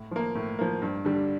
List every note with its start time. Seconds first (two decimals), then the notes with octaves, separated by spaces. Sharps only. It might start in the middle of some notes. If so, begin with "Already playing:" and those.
Already playing: A2
0.11 F3 A#3
0.35 A2
0.59 F3 A#3
0.82 G2
1.05 D3 G3